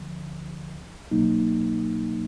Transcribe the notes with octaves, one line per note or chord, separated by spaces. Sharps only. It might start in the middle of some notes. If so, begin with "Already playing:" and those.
Already playing: D2 D3 F3
C2 B2 F#3 A#3 D#4